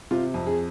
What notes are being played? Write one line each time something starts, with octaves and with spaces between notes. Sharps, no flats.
C3 F4
F2
G#4